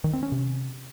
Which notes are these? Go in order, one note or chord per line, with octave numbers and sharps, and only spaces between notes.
D#3
C4
C#4
C3